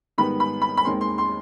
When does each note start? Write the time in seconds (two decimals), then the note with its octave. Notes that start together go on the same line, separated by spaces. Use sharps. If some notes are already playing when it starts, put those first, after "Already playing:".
0.18 G#2 D#3 G3 B3 B5
0.40 B5
0.62 B5
0.77 B5
0.84 D#2 D#3 G#3 C4 C6
1.01 C6
1.18 C6